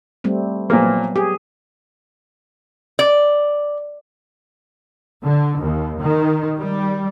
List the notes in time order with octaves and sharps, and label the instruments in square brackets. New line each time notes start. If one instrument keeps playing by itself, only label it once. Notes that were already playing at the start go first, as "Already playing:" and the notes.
[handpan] G3 A3 C4
[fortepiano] A#2 F3 A#3 [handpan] F#3 B3
[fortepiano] G4 [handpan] G#4
[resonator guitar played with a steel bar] D5
[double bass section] D3
D#2
D#3
G3